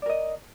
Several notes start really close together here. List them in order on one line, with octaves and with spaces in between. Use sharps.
D5 A#4 D#5